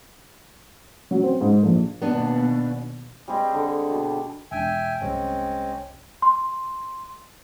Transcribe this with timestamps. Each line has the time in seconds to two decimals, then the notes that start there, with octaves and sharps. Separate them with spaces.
1.11 F#3
1.23 C4
1.41 G#2
1.63 A#1
2.02 D#2 B2 B3 D4
3.28 G3 C4 G#4 D#5
3.53 D3
3.89 B2
4.51 E1 D4 E5 G5 G#5
5.01 C2 F#2 G#3 C4 C#4
6.22 C6